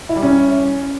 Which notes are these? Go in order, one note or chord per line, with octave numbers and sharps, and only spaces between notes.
E4
G3
C#4